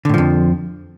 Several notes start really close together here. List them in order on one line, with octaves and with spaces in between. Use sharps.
D3 A2 F3 F2